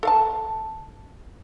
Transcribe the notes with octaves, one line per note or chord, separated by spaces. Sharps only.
A4 F5 A5